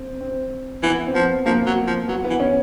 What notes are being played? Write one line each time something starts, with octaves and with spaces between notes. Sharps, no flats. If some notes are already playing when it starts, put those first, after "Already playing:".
Already playing: C4
C4
E3 B3
C4
F3 B3
F3 A#3
F#3
F3
F#3 B3
B3
E3
C#4